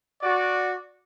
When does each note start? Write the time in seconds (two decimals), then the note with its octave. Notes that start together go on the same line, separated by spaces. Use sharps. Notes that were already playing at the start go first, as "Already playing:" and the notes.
0.22 F#4 D5